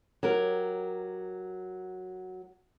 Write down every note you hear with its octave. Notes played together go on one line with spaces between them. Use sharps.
F#3 G4 A#4